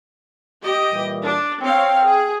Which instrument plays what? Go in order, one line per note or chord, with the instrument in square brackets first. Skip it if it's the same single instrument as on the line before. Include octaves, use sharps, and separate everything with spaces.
[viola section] G4 D#5
[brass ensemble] A#2 E3 G3
[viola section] D4
[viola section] C4 C#5 F5 [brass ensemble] G5
[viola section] G#4